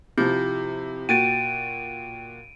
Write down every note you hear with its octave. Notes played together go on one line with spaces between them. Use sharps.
C3 F3 E4 G4 G6
A#2 F#4 G5 A6 D7 D#7